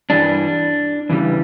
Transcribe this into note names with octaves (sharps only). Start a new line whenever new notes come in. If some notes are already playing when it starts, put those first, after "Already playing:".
G2 E3 G3 D4
E2 C#3 E3 G3